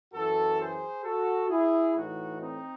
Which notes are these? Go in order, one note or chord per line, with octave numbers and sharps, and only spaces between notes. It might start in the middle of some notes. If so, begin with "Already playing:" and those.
F#2 E3 F#4 A4
G#4 C5
F#4 A4
E4 G#4
A2 E3 D#4 F#4
C4 D#4